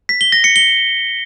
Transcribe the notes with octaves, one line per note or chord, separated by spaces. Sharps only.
B6
G7
A#6
C#7
G7